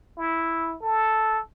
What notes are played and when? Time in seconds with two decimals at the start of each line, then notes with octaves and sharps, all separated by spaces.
0.18 E4
0.82 A4